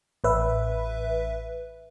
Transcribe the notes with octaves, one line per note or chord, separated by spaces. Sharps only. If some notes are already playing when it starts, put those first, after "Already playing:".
A1 B4 E5